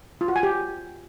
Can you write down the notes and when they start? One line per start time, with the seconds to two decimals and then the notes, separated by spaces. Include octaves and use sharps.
0.21 F4
0.28 F#4
0.36 G#5
0.43 G4